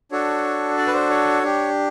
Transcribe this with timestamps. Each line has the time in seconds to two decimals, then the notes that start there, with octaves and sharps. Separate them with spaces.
0.11 D4 F#4 A4 C#5
0.77 D5
0.87 B4
0.94 C5
1.10 C#5
1.43 D4 G4